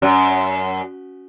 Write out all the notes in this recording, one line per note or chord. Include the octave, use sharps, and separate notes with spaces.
F#2